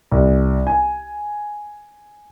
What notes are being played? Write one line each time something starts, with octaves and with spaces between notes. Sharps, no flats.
C2
G#5